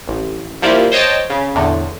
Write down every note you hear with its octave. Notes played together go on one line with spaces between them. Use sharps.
A1
F3 G3 A#3 E4 F4
C5 C#5 D#5 G5 A5
C#3
E2 A2 D3